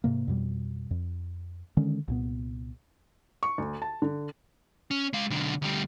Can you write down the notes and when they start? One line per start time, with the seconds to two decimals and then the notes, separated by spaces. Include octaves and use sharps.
0.04 G#2 C3 A#3
0.28 F2 B2 G3
0.91 F2
1.77 D3 D#3 G#3 C#4
2.08 C2 A#2 B3
3.43 C#6
3.58 D2
3.82 A5
4.02 D3
4.91 C#4
5.13 G#3 F5
5.30 B1 D3
5.62 D2 G3